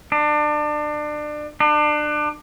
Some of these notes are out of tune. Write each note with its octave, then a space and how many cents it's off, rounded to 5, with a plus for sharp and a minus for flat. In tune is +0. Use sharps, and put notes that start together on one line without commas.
D4 +30
D4 +30